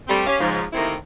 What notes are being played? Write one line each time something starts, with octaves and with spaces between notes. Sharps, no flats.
G3 A3 C4
C#4 G4 F5
G#2 C#3 F3
C3 D#3 A3 A#3 C4 E4